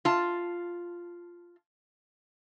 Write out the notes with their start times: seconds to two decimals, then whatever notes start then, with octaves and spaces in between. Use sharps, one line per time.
0.05 F4 A5